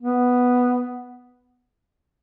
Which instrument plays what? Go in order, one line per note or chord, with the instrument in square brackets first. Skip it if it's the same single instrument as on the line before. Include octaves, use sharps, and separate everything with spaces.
[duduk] B3